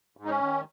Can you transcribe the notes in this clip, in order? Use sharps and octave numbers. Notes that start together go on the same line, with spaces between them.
G#2
D#4
C#4
D#3